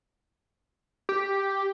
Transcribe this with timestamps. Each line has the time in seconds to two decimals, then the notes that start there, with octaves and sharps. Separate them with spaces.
1.09 G4